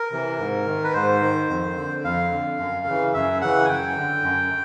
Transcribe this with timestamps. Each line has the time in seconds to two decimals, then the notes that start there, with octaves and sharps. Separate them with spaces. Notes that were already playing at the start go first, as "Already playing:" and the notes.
Already playing: A#4
0.12 C3 E3
0.39 G#2
0.67 D#3
0.84 B4
0.93 G#2 C5
1.22 D#3
1.49 F2
1.77 D3
2.04 F2 F5
2.32 D3
2.59 F#2
2.86 C#3 E3
3.14 F#2 E5
3.41 C#3 E3 F#5
3.65 G#5
3.68 F#2 G5
3.97 D3
4.23 F#2